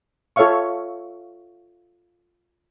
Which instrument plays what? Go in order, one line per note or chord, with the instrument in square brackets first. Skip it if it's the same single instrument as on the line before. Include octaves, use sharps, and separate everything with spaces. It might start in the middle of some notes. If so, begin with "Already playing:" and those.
[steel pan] F4 A4 C#5 E5 F5 C#6